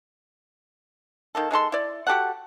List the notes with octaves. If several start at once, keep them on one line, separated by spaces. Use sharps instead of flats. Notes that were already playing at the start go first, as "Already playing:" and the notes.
D#3 A#3 A4
G#3 D#4 A4 C6
E4 D5
F#4 G4 A4 F#5